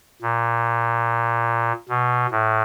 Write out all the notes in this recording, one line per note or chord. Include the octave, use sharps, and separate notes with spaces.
A#2
B2
A2